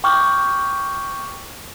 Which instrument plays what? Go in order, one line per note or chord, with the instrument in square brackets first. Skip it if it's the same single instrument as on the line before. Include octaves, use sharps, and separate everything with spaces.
[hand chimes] G5 C#6 D6 F6 G6